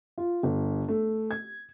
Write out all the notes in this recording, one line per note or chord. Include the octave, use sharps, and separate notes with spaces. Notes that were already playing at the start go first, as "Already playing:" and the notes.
F4
G1
A3
G#6